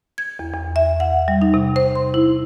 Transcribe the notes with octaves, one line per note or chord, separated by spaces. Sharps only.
G#6
E2
E2
E5
F#5
G3
D#4
C3
C5
C6
E4